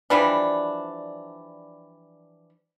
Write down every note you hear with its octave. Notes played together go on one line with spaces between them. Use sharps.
E3 F3 G3 D4